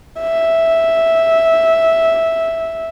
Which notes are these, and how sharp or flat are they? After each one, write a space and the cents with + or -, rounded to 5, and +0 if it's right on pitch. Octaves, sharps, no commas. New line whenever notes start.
E5 -5